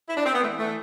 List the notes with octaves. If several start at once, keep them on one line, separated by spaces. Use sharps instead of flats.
E4
D4
C4
B3
E3 A3
E3 A3